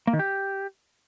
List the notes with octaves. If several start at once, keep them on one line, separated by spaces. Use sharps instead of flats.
A#3
D#3
G4